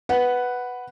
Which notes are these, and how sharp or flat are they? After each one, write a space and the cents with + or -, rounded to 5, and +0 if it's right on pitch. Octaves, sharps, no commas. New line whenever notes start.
B4 +0 F#5 +0